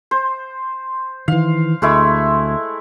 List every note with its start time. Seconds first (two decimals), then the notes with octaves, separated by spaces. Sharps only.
0.11 C5
1.28 D#3 E3 F5
1.82 D2 G#3 A3 E4